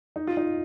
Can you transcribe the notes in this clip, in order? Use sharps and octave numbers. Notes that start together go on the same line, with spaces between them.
D#4
F4
D#4